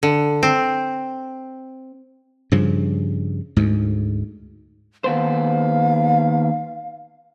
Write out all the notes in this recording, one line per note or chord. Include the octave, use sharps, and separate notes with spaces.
D3
C4
G2 C#3 F3
D2 G#2
D#2 B3 C5 F5